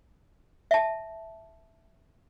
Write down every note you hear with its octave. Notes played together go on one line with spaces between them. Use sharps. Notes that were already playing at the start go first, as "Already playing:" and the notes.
E5 A5